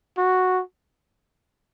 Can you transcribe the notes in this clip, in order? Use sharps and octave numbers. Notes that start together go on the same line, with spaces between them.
F#4